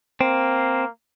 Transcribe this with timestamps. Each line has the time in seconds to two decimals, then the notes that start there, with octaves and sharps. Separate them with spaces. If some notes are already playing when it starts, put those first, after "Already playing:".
0.21 A#3 C4